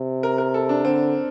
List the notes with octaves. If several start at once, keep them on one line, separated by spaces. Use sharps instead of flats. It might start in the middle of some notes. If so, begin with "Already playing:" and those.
Already playing: C3
A#4
A#4
A4
D4
D3 C4